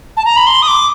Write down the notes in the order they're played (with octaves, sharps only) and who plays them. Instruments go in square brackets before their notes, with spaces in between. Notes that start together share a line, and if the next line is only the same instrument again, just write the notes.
[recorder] A5
A#5
B5
C6
D#6
D6